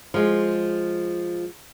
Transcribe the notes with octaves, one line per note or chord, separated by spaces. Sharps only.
F3 G#3